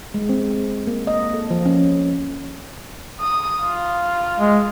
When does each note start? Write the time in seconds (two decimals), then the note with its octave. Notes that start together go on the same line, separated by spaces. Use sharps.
0.14 G#3
0.29 C4
0.87 A#3
1.07 D#5
1.34 A4
1.50 F3
1.66 C#4
3.20 D#6
3.63 F4
4.39 G#3